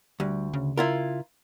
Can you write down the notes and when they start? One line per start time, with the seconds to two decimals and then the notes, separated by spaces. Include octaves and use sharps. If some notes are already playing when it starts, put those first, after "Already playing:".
0.20 D2 G3
0.53 C#3
0.78 E4 F4 A#4